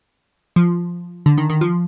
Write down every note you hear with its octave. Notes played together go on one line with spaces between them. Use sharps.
F3
D3
D#3
D#3
F3